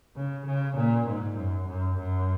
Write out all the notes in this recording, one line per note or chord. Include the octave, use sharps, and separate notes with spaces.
C#3
C#3
A#2
G#2
F#2
F#2
F#2